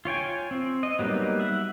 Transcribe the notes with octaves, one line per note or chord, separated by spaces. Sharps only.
F4 C#5 G5 G#5
C4
D#5
F#3 G3 A#3 B3 D#4
E5 F#5